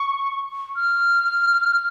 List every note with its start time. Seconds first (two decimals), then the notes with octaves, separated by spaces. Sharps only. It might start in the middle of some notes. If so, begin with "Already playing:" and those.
Already playing: C#6
0.76 F6